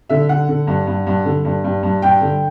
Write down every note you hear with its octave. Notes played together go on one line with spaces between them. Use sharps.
D3 E5
D3 F#5
D3
G2
G2
G2
D3
G2
G2
G2
G2 G5
D3